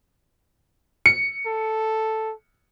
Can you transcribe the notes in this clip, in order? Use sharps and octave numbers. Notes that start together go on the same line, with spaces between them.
C#7
A4